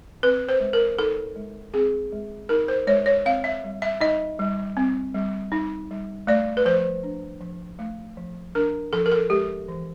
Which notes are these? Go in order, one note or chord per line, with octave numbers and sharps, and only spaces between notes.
C4 B4
C5
G#3
A#4
D#4 A4
G#3
C4 G#4
G#3
D#4 A#4
C5
G#3 C#5
C#5
C4 F5
E5
G3
E5
D#4 D#5
G3
C4
G3
D#4
G3
A3 D5
B4
F3 C5
D4
F3
A3
F3
D4 A#4
F3 A4
A#4
A4
G#3 G4
E3